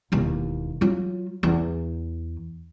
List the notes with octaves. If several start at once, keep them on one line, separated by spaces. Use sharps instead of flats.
E1 D#2
F#3 F4
E2